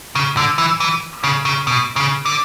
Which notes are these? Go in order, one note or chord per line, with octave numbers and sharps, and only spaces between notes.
C#3
D3
E3
E3
C#3
C#3
B2
C#3
D3